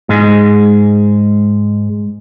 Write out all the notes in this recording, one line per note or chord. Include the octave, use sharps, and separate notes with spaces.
G#2 G#3